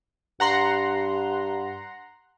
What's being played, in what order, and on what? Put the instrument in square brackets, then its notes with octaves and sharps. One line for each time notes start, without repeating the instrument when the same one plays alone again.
[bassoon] G2 [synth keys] F#5 A#5 C6